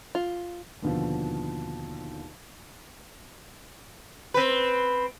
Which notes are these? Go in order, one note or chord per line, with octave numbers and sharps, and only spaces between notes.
F4
D#2 B2 D3 D#3 F3
C4 B4